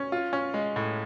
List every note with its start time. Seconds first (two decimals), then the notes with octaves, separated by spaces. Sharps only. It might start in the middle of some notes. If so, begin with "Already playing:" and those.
Already playing: C#4
0.12 F4
0.33 C#4
0.54 G#3
0.76 A2